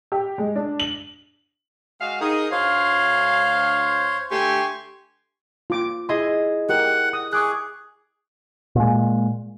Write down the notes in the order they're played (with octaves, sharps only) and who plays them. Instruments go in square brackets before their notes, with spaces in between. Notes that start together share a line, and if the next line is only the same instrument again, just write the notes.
[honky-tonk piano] G4
G#3
D4
F#7
[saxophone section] G#3 F#4 F5
[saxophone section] D#4 G#4 [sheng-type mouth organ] A#4 D#6
[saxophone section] D2 F5 [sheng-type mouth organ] C5 C#5
[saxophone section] D3 A3 G4 [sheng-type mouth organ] G#5 C6 C#6
[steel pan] F4 D6
[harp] E4 G#4 D#5 [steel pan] C6
[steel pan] G4 A#4 [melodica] F#5
[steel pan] D#6
[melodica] G#4 [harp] C#6 D6 F#6
[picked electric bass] A#2 G#3